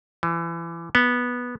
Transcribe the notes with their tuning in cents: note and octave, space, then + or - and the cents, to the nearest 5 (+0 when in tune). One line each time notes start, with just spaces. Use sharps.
E3 +30
B3 -10